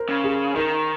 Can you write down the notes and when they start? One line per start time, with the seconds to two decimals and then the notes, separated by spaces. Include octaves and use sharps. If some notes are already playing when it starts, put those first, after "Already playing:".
Already playing: A#4 C5
0.09 C#3
0.24 G#4
0.55 D#3 A#4